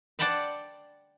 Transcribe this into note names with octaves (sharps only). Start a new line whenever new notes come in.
D5 F#5 G5 A5 B5 C6